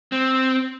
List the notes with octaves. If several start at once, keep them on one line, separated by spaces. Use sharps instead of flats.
C4